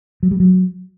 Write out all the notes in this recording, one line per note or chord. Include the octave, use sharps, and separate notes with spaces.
F#3
G3
F#3